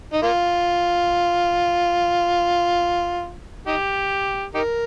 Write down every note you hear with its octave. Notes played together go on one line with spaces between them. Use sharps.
D#4
A#3 F4
D#4 G4
D#4 G4 A#4